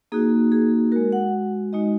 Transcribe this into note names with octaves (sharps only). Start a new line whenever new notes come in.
A#3 D#4 F#4 G#4
G#4
G#3 F#4 A#4
F#5
G#3 D#4 F#4 D#5